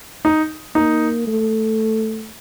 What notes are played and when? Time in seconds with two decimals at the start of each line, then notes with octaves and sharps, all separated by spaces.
0.25 D#4
0.75 A#3 D#4
1.27 A3